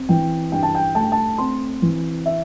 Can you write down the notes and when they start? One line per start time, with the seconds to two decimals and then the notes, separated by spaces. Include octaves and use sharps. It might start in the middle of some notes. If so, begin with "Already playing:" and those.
Already playing: C4
0.09 E3 G5
0.52 G2 G5
0.63 A5
0.75 G5
0.95 A3 A5
1.03 G5
1.12 A5
1.38 C4 C6
1.82 E3
2.26 E5